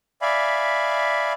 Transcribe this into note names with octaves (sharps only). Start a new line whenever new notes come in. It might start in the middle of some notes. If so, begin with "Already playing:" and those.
D5 E5 F5 G#5 B5